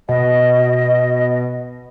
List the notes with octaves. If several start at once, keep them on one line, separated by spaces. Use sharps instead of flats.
B2 D#5